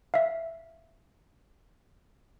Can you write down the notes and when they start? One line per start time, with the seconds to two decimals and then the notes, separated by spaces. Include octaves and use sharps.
0.14 E5 F5